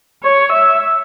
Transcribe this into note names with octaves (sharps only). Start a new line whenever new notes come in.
C#5
E5